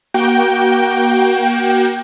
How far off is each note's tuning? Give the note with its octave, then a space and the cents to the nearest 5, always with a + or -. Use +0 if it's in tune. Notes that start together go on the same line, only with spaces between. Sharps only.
A#3 +30 F#4 +25 G5 +0